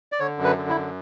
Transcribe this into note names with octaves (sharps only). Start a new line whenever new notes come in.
D5
D3 C#5
F#2
B4
D3
E4
F#2